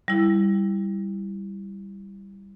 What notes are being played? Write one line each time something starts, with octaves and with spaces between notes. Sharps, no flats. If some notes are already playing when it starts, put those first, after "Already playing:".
G3 E4